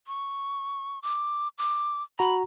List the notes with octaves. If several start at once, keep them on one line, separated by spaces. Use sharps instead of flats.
C#6
D6
D6
F#4 A#5 B5